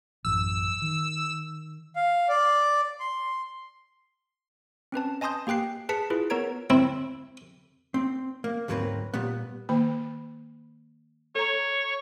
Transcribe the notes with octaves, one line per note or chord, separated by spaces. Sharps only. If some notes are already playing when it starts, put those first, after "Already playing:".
A1 F#2 E6
D#3
F5
D5
C6
C4 C#4 B4 A5
D#5 G#5 A5 C6 D#6 G6
A#3 G4 G5 F#6 C7
G#4 B4 A5 B6 C#7
E4 F4 G#4 B4
B3 A#4 C#5 A#5 G#6 D7
C4 E4
C4
A#3
D2 G#2 F#3 A#3 C4 B4
A#2 G3 B3
D#3 A#3 B5
A4 C#5 A#5